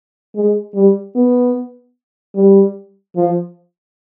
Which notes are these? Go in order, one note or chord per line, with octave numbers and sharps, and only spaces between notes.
G#3
G3
B3
G3
F3